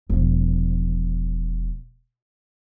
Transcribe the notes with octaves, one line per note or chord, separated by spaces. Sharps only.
E1 F3